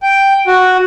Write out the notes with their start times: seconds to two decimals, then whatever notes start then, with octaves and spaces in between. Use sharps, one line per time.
0.03 G5
0.47 F#4